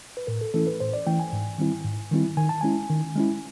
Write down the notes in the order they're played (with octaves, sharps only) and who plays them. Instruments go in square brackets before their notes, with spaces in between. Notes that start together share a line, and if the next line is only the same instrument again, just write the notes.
[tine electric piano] B4
A2 A#4
A4
E3 A3 C#4 E4 A4
B4
A2 C5
D5
E3 A3 C#4 E4 G5
G#5
G#2
D#3 G3 C4 E4
G#2
D#3 G3 C4 E4
D#3 G#5
A5
G#3 C#4 E4 G#5
D#3
G#3 C#4 E4